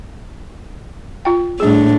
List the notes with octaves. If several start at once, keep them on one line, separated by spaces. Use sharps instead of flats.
F4 G5
A2 G3 D4 G#4